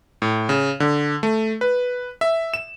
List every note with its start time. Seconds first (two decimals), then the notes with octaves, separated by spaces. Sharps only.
0.22 A2
0.49 C#3
0.80 D3
1.23 A3
1.61 B4
2.21 E5
2.54 E7